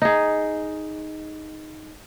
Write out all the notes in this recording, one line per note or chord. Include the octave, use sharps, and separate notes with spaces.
D#4 G#4